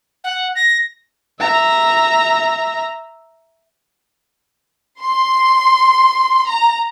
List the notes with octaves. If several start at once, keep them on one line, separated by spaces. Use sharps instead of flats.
F#5
A#6
E5 A#5
C6
A#5